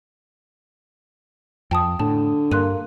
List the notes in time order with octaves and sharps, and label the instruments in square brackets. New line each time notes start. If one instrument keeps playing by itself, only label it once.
[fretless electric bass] F2 [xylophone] G5 A5 D#6
[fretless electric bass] A2 [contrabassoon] D3 [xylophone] A5
[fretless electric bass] G2 [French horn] A#3 [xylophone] C6 F#6 D#7